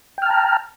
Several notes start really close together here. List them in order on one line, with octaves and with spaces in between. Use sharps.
G5 F6 A5 A#5